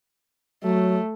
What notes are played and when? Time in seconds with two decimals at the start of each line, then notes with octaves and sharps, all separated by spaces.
0.64 F#3 A3